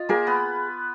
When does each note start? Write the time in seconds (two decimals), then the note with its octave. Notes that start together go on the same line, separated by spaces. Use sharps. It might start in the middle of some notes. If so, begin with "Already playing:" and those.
Already playing: F4 D#5
0.09 A#3 G#4 A#4
0.27 B3 B4